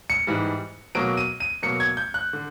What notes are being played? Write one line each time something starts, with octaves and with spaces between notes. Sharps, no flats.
C#7
G#2 E3 G3
B2 F#3 A#3 D7
D#7
D#7
B2 F#3 A#3 C#7
G#6
G6
F#6
D3